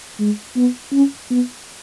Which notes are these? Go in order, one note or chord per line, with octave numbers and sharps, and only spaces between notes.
G#3
B3
C#4
B3